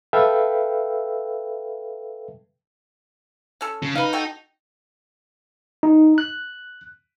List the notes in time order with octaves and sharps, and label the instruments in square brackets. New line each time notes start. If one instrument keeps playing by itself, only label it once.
[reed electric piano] A4 B4 E5 F5 G5
[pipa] C#4 A4
[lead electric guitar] C#3
[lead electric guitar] D#4 [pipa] B4 F5
[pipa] F#4 A4 G5
[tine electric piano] D#4
F#6